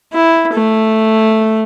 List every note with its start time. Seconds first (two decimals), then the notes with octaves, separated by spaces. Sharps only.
0.13 E4
0.53 A3